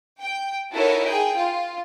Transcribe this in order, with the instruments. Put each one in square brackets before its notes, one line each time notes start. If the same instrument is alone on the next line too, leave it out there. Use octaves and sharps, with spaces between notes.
[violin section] G5
D#4 E4 F#4 A4 A#4 C#5
G#4 G5
F4